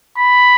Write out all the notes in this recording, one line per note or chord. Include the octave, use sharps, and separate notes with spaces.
B5